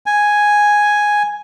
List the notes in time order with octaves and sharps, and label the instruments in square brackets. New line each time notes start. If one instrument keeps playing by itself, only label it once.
[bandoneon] G#5